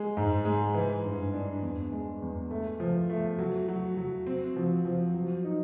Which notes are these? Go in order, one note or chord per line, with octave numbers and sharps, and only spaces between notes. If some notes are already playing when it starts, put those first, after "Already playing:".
Already playing: G#3
G#2
G#3
E3
G2
D4
E2
G#3
E2
A3
F3
A3
F#3
F#3
F#3
C4
F3
F3
F#3
D#4